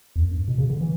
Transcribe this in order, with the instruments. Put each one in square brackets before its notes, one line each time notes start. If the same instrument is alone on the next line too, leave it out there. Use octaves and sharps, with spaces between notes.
[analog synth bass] E2
F#2
G2
B2
C#3
D3
E3